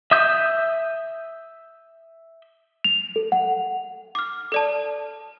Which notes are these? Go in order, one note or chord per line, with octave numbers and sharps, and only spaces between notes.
E5 D#6 G6
F7
A4
F#5
D6 F6
A4 D5 A5